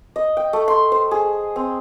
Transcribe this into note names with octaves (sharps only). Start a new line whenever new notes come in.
D#5
G5
A3
C6
C5
G#4
C4